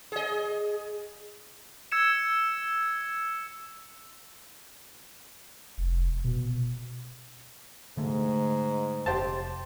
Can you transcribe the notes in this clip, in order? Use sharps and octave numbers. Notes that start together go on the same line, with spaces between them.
G#4 D#5
E6 G#6 C#7 E7
F1
B2
G#2 D3 A3
F1 G4 C5 A5